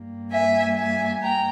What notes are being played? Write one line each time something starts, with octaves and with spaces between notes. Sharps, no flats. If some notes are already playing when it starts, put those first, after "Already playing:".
Already playing: G2 G3 A#3
E5 G#5
E5 G#5
G5 A#5